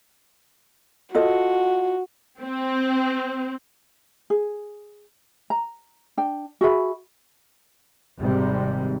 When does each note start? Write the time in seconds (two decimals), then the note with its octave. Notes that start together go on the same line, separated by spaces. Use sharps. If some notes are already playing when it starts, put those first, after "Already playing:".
1.15 F4 F#4 A4 D#5
2.42 C4
4.30 G#4
5.50 A#5
6.17 D4 G5
6.61 F#4 G#4 E5 B5
8.21 G#1 G#2 C3 G3